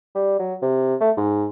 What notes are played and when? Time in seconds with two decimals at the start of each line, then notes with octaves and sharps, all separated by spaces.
0.15 G3
0.39 F#3
0.62 C3
1.01 A3
1.17 G#2